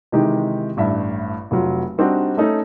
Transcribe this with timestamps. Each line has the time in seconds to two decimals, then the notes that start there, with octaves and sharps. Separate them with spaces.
0.12 C3 D#3 E3 G#3 D#4 G4
0.77 A1 G2 E5
1.51 F1 F#3 F4
1.98 G3 C4 D4 D#4 F#4
2.37 A3 C#4 D#4 A4